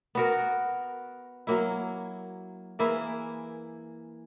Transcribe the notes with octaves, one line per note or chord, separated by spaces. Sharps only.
B3 F#4 A#4
F#3 A#3 E4
E3 A#3 E4 G#4